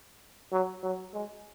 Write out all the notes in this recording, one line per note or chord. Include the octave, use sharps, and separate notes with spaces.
F#3
F#3
G#3